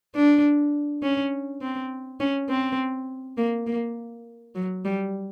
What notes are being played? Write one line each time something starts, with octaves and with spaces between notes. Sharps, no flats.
D4
C#4
C4
C#4
C4
A#3
A#3
F#3
G3